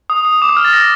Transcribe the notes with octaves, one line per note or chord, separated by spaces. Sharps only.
D#6
D#6
D6
D#6
F6
A6
A#6